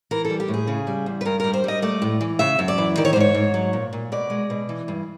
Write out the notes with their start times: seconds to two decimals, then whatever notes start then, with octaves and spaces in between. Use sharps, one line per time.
0.11 E3 A#4
0.25 A4
0.30 G3
0.40 G4
0.48 A2
0.54 G#4
0.67 C#3
0.87 G3
1.06 E2
1.21 B4
1.25 G2 A#4
1.40 G3 A#4
1.53 C5
1.64 G3 D#5
1.82 A3 D5
2.02 A2
2.21 E3
2.39 C#3 E5
2.59 F#2
2.68 D5
2.78 E3
2.97 D#3 D5
3.05 C#5
3.13 C5
3.16 G#2 C#5
3.34 G#2
3.54 F#3
3.73 A#2
3.93 A#2
4.12 B2 D5
4.30 G#3
4.50 B2
4.69 E3
4.88 G2